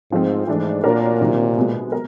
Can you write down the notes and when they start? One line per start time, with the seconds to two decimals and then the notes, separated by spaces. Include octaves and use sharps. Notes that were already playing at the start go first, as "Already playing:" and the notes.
0.12 G#2 F3 A3 C4
0.47 G#2 E3 A3 D4
0.84 A#2 A#3 D4 F#4 A#4 C#5
1.21 C3 D#3 F#3
1.57 B2 G#3 B3
1.92 A#4